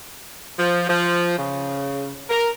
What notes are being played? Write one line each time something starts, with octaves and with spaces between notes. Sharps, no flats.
F3
F3
C#3
A#4